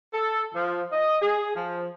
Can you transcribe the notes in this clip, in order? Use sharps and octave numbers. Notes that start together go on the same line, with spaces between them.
A4
F3
D#5
G#4
F3